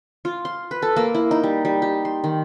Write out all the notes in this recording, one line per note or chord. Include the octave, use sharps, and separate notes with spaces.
F4
C6
B4
A4
A#3
E4
D#4
G3
G3
G4
C6
D#3